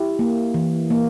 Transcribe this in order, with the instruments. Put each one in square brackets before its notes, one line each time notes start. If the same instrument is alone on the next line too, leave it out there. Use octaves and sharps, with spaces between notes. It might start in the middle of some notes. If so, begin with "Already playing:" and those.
Already playing: [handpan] E4 G4
A#3
E3
A#3